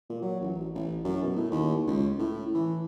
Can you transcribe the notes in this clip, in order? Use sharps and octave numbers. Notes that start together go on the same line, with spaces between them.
A#2
F#3
A1
A1
F#2
B2
A2
D#2
C#2
A2
E3